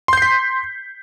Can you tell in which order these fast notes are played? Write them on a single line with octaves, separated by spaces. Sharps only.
C6 G6 C7 B6